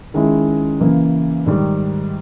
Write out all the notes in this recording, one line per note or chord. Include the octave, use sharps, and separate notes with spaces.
D#3 G#3 C#4 E4
C#3 E3 A#3
G#2 D#3 G3